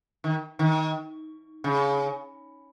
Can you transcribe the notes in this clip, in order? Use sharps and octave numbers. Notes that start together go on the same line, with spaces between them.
D#3
D#3
C#3